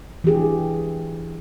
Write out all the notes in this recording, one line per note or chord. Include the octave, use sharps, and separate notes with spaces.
E3 D4 G4 G#4